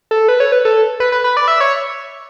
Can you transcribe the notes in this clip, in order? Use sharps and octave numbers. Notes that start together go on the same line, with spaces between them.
A4
B4
C#5
B4
A4
B4
B4
B4
D5
E5
C#5